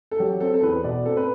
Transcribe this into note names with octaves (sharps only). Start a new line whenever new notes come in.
A4
F#3 G4
C4 A4
A4
E2 B4
B2 D5
C4 A4
B4